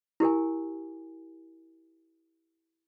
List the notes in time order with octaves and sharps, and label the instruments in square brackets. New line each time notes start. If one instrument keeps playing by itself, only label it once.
[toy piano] E4 G4 A#4 G#5